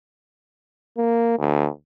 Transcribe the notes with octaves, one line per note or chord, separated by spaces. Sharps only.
A#3
D2